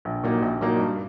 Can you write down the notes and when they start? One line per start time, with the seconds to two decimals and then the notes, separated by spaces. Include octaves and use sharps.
0.05 A#1
0.23 A#2 F#3 A#3 D#4
0.42 A#1
0.61 A#2 F#3 A#3 D#4
0.79 G2